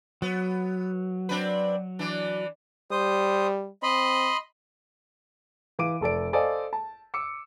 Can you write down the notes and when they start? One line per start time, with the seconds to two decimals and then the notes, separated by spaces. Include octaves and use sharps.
0.22 F#3 B3
1.29 C4 D4 B4
1.99 E3 D4
2.91 G3 C5 D#6
3.83 C4 D#5 B5 C6
5.79 E3 F5 D6 D7 D#7
6.01 F1 A4 D5 D7
6.33 A4 C5 D5 D#5 F5 G#5
6.73 A5
7.14 D6 E6 C#7